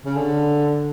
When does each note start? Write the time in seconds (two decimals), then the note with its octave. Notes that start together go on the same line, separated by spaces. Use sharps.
0.04 C#3
0.16 D3